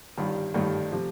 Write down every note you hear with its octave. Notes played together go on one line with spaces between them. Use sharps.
G1 G2 D#3 G3
G1 G2 D#3 G3 A3
C3 F3